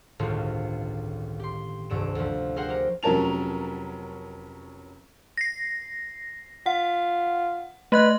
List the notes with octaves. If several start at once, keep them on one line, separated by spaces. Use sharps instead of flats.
G1 C#2 A2 D#3 C4 F4
G4 C6
D#1 C2 G2 D7 E7
D2 F3
G#4 A#4 C5 F#5 G5
G4 A#4
F1 F#3 C#4 A#4 A5 F7
A#6 C7
F4 F#5
A3 B4 D#5 F#6